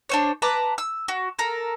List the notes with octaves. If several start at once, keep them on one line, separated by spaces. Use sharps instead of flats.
D4 C5 C#5
B4 A5 A#5 D6
E6
F#4
A4 A#4